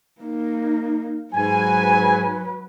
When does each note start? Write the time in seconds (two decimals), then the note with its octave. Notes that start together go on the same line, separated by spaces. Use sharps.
0.21 A#3 D#4
1.34 G#2 F#3 B4 G#5